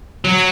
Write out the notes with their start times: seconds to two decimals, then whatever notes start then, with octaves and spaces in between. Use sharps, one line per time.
0.25 F#3